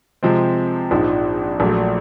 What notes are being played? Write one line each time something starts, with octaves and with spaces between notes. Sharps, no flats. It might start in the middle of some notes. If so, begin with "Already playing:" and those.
C3 F3 G#3 C4
A#1 G#2 F3
A#1 A#2 F#3 A3